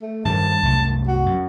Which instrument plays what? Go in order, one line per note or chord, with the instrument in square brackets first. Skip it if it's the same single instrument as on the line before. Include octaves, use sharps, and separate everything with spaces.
[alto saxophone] A3
[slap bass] G2 D#3 F3 [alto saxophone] A5
[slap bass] C2 F#2 A3
[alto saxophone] F#4
[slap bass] F#2